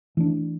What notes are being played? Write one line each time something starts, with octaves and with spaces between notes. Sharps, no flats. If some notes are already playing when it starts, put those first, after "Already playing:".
E3 A3 D4